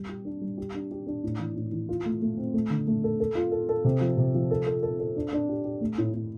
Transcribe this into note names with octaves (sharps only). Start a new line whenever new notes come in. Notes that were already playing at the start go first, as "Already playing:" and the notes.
Already playing: G3
G4
D4
G3
G4
D4
G4
D4
A2
E3
A2
E3
F4
A3
A3
C4
A3
D3
A3
A4
A4
F4
A4
A4
C3
F3
C3
F3
A4
A4
A4
A4
D4
D4
G4
G4
A3
A2
A2